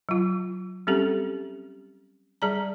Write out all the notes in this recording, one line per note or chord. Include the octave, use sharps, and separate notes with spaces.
F#3 F4
G3 C4 C#4 G4 A4
G3 G#4 D5 A5 A#5